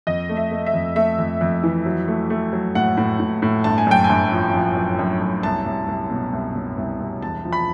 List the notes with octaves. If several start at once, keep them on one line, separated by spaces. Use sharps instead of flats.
F2 D#5
A3
E5
A3
E5
F2
A3 E5
F2
F2
E3
F#3
A3
A3
F#3
A2 F#5
A2
A2
A2
G1 A5
G#5
F#2 G5
G#5
G1
F3
F3
F#2
F#2
F#2
C2 A5
C2
C2
B2
C2
B2
C2
C2
E1 A5
F3
B5